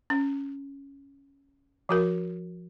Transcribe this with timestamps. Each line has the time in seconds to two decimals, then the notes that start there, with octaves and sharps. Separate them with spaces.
0.10 C#4
1.89 F3 F#4 A#4